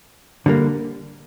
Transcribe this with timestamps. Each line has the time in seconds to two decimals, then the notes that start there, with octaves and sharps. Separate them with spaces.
0.46 D3 G3 A#3